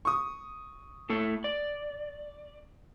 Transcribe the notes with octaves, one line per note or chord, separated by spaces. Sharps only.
C#6 D#6
A2 A3 A4
D5